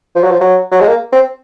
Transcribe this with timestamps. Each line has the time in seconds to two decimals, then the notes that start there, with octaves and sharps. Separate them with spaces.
0.15 F3
0.23 F#3
0.31 F3
0.41 F#3
0.72 F#3
0.80 G#3
0.88 A#3
1.12 C4